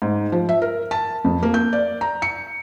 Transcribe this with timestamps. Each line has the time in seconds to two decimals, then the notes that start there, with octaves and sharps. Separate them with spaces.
0.02 G#2
0.32 F3
0.49 E5
0.62 A#4
0.91 A5
1.24 F2
1.43 A#3
1.54 G6
1.73 D5
2.01 A#5
2.22 C#7